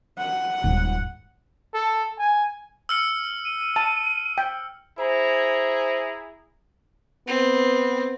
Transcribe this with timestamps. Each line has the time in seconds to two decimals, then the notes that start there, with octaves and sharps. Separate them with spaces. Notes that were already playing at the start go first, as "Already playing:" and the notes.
0.18 F#5
0.64 D#1 D#2 G#2
1.74 A4
2.19 G#5
2.89 E6 F6 C#7
3.45 D#7
3.76 A5
4.38 G5
4.98 E4 G#4 C5 A#5
7.28 B3 C4